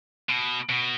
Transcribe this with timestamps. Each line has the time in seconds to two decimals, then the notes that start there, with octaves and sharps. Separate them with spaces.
0.29 B2
0.69 B2